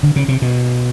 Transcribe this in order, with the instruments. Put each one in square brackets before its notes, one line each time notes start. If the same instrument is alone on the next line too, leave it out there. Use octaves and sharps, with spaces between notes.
[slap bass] D3
C#3
C3
B2